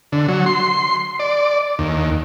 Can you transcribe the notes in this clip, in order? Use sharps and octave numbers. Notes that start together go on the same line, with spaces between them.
D3
F#3
C6
D5
D#2